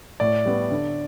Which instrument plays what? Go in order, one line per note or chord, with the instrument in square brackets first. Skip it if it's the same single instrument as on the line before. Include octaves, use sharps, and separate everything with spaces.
[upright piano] A2 [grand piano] D5
[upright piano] G3 B3
D3